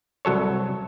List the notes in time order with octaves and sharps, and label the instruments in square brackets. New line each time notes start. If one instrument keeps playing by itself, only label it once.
[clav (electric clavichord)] C2 F#3 A4 C#5